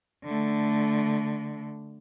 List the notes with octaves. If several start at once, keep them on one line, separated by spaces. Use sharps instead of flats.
D3 A3